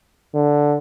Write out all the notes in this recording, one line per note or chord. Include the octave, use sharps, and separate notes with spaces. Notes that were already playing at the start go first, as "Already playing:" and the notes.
D3